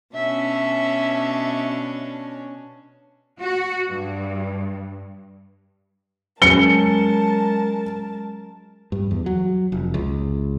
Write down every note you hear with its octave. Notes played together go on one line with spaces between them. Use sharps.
B2 C#4 D4 E5
F#4
G2
F#3 G#3 C#4 G#4 A#4 A5 C#7 G7
G2
E2
F#3
F1
C#2